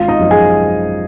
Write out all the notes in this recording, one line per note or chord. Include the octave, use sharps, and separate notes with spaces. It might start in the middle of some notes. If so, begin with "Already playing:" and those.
Already playing: G#1 F4 F5
D#4 D#5
F#2 F3
G#4 G#5